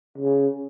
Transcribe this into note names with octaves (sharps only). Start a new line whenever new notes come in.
C#3